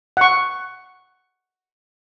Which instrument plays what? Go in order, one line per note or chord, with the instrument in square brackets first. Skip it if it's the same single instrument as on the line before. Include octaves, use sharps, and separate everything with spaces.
[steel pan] F#5 C#6